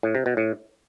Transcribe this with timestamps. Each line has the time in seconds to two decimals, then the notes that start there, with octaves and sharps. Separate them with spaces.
0.03 A2
0.15 C3
0.26 B2
0.37 A2